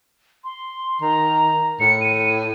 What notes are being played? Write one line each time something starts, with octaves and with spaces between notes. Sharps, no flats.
C6
D#3 A#5
A2 C#7
D#7